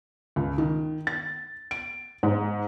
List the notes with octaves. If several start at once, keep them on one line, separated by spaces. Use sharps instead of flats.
C#2
D#3
A6
D7
G#2